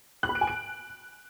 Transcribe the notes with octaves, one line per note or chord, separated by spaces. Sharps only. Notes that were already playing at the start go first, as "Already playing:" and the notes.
F#6
B5
D7
G#5
D7